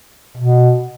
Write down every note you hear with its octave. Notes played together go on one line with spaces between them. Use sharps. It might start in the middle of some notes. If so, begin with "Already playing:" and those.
B2